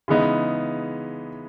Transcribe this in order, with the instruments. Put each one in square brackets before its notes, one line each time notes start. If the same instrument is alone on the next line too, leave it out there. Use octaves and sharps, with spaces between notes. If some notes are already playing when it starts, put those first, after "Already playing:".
[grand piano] C#3 E3 G#3 B3 D#4